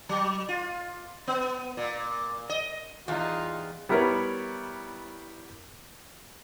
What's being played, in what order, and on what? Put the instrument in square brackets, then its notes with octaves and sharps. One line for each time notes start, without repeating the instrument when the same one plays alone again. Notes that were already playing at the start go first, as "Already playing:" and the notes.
[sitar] F#3
F4
B3
A#2
D#5
[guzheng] E2 G3 [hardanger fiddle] D#4 [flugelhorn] F4
[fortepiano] G3 B3 E4 A#4 B4 C#5